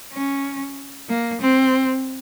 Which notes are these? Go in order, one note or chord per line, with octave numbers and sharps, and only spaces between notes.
C#4
A#3
C4